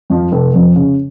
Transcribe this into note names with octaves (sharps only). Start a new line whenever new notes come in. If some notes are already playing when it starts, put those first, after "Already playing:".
F2 F3
F1
F2 F3
C#3